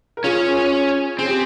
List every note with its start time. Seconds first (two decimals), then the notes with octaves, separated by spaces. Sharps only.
0.17 A#4
0.24 C#4 F4 G#4
1.19 C4 G#4
1.29 G4